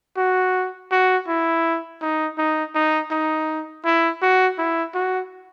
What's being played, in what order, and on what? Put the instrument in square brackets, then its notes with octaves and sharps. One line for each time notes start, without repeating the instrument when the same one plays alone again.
[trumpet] F#4
F#4
E4
D#4
D#4
D#4
D#4
E4
F#4
E4
F#4